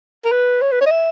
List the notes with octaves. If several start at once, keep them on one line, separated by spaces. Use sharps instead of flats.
A#4
B4
C#5
B4
C#5
D#5
E5